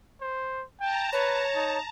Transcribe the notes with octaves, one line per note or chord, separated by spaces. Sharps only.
C5
G5 A5 A#5
B4 C#5
D#4